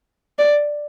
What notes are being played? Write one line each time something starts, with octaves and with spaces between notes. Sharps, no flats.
D5